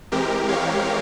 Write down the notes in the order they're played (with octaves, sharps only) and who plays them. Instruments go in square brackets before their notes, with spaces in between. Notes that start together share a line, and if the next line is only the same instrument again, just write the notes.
[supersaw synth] E3 G#3 C4 G4 A#4
C#5 F5